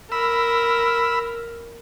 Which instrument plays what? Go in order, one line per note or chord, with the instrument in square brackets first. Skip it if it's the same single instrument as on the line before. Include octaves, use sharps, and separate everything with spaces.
[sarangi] A#4 [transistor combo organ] B5 E6